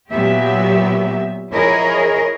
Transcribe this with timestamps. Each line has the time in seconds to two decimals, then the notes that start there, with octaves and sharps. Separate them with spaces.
0.11 A#2 F#3 B3 G4 E5
1.52 F3 E4 G#4 A#4 C#5 D#5